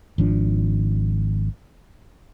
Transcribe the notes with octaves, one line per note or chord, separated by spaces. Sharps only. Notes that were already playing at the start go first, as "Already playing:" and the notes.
G#1 F3 D4